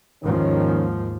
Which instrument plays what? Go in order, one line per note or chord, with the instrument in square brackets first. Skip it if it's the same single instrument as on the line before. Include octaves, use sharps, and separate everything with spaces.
[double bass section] D#2 G#2 F3 [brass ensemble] D#3 C#4